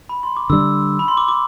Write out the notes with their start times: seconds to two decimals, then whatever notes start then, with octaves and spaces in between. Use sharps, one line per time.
0.09 B5
0.23 C6
0.37 D6
0.50 D3 G3 D4 E6
0.99 B5
1.08 C6
1.17 D6
1.28 D6